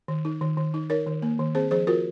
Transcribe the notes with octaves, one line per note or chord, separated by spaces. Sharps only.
D#3
D#4
D#3
D#3
D#4
D#4 A#4 C#5
D#3
A#3
D#3
C4 G#4 C5
F3 G#4 C5
F4 F#4 A#4